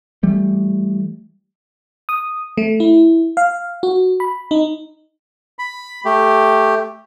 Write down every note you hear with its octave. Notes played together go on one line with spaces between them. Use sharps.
E3 G3 A3
D#6
A3
E4
F5
F#4
B5
D#4
B5
A3 G4